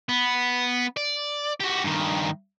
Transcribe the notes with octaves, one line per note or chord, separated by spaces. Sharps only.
B3
D5
F#4 G4
G2 D#3